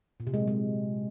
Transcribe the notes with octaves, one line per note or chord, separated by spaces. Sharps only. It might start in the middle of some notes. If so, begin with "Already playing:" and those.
A#2
C3
G#3
F#3
G#3